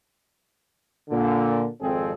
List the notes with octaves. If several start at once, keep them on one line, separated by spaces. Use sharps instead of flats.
A#2 D3
G#1 F2 C4 G#4 A4